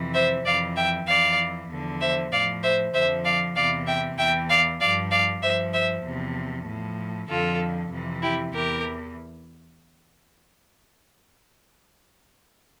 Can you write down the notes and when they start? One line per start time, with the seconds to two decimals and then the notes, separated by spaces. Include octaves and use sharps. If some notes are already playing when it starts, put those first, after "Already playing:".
Already playing: F2 C3 E3
0.14 C5 E5
0.45 F2 E3 D5 F5
0.76 E5 G5
1.07 F2 E3 D5 F5
1.69 E2 D3 F3
2.01 C5 E5
2.32 A2 F3 D5 F5
2.63 C5 E5
2.93 F2 D3 F3 C5 E5
3.25 D5 F5
3.56 E2 C3 E3 D5 F5
3.87 E5 G5
4.18 E2 E3 E5 G5
4.50 D5 F5
4.80 G2 F3 D5 F5
5.11 D5 F5
5.42 G2 F3 C5 E5
5.73 C5 E5
6.05 E2 C3 F3
6.67 A2 F3
7.29 F2 D3 F3 F4 A4
7.91 F2 C3 E3
8.22 E4 G4
8.53 E2 E3 G4 A#4